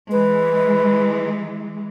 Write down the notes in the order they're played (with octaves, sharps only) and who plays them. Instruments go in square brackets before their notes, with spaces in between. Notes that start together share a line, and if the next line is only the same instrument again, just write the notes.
[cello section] E3 G#3 [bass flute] B4